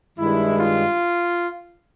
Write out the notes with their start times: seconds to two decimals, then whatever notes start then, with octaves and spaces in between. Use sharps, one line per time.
0.18 G2 D#3 G#3 E4
0.60 F4